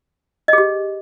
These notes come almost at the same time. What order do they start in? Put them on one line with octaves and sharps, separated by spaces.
D#5 G#4 G4